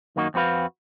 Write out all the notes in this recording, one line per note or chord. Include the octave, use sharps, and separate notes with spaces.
F#2 D#3 A#3 D#4 F#4
F2 C4 F#4 B4 F5